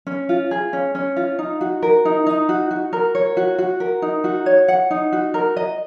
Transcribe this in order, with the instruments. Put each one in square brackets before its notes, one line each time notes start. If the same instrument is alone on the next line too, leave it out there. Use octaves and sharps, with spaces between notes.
[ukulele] C#4
F4
G#4
C#4
C#4
F4
D#4
F#4
A#4
D#4
D#4
F#4
F#4
A#4
C#5
F#4
F#4
A#4
D#4
F#4
C#5
F#5
D#4
F#4
A#4
D#5